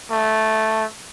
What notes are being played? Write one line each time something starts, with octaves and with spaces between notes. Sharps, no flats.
A3